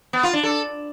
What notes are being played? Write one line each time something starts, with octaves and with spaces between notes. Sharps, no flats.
B3
F4
D4
A4